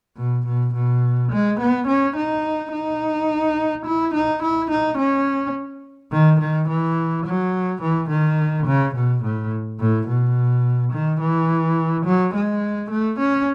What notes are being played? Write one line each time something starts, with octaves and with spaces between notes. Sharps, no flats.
B2
B2
B2
G#3
B3
C#4
D#4
D#4
E4
D#4
E4
D#4
C#4
D#3
D#3
E3
F#3
E3
D#3
C#3
B2
A2
A2
B2
D#3
E3
F#3
G#3
A3
C#4